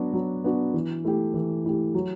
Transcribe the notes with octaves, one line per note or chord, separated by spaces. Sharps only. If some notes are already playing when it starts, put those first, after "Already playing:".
Already playing: F#3 B3 D4 F#4
F#3
B3 D4 F#4
E3
A3 E4 G4
E3
A3 E4 G4
F#3